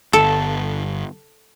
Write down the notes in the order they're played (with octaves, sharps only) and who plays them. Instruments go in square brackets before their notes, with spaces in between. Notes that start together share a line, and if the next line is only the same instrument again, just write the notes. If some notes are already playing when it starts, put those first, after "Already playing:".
[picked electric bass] G1 [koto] A4